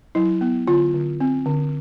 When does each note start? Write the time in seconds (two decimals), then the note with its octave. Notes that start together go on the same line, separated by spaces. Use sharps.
0.15 F#3 E4
0.41 B3
0.67 D3 F4
0.95 D3
1.20 C4
1.46 D3